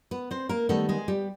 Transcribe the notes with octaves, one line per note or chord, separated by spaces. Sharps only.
B3 B4
C4 C5
A#3 A#4
D#3 G3 A3 B3 A4
G#3 G#4
G3 G4